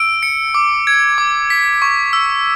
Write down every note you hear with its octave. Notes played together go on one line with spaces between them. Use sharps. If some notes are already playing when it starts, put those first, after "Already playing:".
Already playing: E6 D7
C#7
D6
G#6
D6
B6
C#6
E6